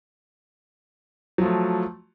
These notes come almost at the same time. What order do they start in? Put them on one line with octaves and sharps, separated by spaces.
F#3 F3 A3